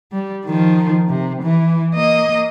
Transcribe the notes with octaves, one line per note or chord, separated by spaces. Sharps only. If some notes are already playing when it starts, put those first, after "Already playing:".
G3
D#3 F3
C3
E3
A#3 D#5